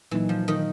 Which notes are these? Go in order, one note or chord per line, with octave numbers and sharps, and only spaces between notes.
A#2 E3 F#3 A#3 D#4
F3
D#3